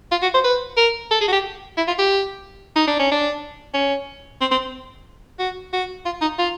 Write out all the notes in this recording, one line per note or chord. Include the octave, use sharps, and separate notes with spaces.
F4
F#4
C5
B4
A#4
A4
G#4
F#4
G4
E4
F4
G4
D#4
D4
C#4
D4
C#4
C4
C4
F#4
F#4
F4
D#4
F4